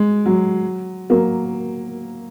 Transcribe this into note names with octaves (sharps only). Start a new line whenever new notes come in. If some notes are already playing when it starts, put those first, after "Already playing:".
Already playing: G#3
F#3
F#3 A#3